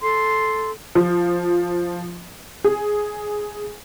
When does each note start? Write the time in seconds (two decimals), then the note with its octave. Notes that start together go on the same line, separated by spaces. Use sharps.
0.01 A4 C6
0.95 F3
2.64 G#4